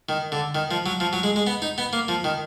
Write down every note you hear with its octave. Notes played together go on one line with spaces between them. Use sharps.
D#3
D3
D#3
F3
F#3
F3
F#3
G#3
G#3
B3
D#4
B3
A#3
F3
D#3